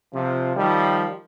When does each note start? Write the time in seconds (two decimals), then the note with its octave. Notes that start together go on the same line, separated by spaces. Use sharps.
0.14 C3 F3
0.56 D#3 F3 G3